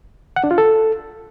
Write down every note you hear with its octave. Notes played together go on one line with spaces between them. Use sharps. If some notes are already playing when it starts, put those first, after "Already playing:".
F#5
D4
F4
A4